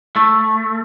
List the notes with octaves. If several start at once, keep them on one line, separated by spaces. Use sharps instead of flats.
A3